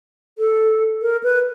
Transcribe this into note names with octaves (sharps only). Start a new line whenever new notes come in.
A4
A#4
B4